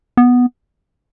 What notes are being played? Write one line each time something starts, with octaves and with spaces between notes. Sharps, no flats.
B3